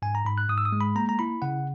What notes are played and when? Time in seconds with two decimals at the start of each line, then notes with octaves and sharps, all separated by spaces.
0.02 G#2 G#5
0.15 A#5
0.25 G#2 B5
0.38 F#6
0.49 G#2 D#6
0.58 E6
0.65 D#6
0.72 G#3
0.81 B5
0.96 A#3 A#5
1.09 A#5
1.19 E4 B5
1.42 C#3 F#5